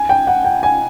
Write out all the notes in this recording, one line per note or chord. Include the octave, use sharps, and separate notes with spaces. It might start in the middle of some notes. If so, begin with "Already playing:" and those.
Already playing: G#5
G5
F#5
G5
G#5